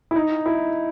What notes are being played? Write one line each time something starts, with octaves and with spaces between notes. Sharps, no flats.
E4
D#4
E4